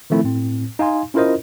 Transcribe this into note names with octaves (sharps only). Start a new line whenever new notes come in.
D#3 F3 A3 C4 E4
A2 C4
D#4 F5 G#5 C6
C#4 E4 F4 A#4 C5 D#5